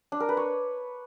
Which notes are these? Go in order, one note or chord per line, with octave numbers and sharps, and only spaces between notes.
D4
A#4
B4
C#5